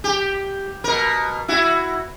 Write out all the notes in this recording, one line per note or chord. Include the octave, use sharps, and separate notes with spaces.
G4
B2 A#4
E4 F#4